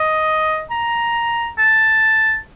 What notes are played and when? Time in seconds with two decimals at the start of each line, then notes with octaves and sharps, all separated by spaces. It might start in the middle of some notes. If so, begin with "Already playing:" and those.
Already playing: D#5
0.70 A#5
1.58 A5